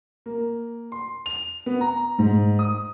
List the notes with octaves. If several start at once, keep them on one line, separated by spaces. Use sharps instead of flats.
A#3
C6
F7
B3
A#5
G#2
D#6